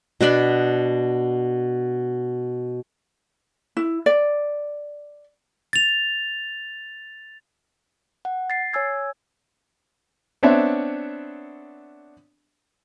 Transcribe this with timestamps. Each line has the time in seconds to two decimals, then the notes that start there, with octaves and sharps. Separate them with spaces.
0.21 B2 B3 D4 B5
3.77 E4
4.06 D5
5.73 A6 F7
8.25 F#5
8.50 A6 C7
8.73 C#5 G#5 E6 G#6
10.43 B3 C4 D4 C#5 E5